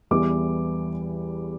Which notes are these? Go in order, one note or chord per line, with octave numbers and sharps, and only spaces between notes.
E2 E3 G3 D6